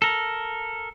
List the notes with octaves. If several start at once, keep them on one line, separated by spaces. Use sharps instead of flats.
A4 A#4